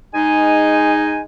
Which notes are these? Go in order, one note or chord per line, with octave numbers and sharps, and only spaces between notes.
G#3 D#4 G#5